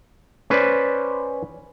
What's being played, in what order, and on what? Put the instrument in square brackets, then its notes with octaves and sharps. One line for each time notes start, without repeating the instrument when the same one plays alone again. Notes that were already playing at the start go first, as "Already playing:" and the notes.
[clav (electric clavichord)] C#4 B4 C5 D5